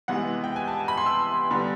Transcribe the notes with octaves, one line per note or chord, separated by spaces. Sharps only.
C3 E3 G#3 B3 F#5
G5
G#5
A5
A5
B5
C6
E6
D3 G3 B3